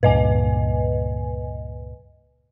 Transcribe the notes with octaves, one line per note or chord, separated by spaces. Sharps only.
C#2 G2 A#2 B4 D#5 G#5